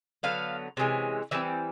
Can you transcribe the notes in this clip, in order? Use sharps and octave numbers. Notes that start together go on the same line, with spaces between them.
D3 F#3 B3 F5
C3 E3 G#3 C#4
E3 G3 C4 E5